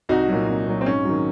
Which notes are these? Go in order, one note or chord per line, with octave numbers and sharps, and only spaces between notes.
C2 D#4 F#4
A#2 F#3
C2
A#2 F#3
C4
G#2 C#4
D#3 F#3